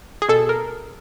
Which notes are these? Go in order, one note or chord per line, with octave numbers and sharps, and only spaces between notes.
G#4
B2 A4
A#4